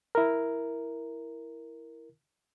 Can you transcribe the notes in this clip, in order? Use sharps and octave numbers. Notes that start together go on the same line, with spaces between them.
E4 A#4